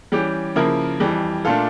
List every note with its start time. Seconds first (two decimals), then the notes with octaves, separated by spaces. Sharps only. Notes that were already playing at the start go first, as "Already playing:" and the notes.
0.12 E3 G3 C#4 G4
0.56 C#3 F3 A#3 E4 A#4
1.00 F2 E3 G3
1.45 A#2 A3 D4 F4 A4